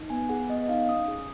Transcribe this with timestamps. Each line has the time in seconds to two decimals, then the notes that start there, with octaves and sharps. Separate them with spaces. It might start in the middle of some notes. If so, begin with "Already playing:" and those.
Already playing: D#4
0.10 B3 G#5
0.29 G#4 F#5
0.49 B3 D#5
0.63 D#5
0.69 D#4 F5
0.89 C#4 D#6
1.08 G#4